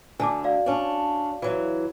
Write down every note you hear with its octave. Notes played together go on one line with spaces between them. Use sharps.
D2 D3 G#5 A5 D6
F#4 D5 F5
C#4 D4
E3 F#3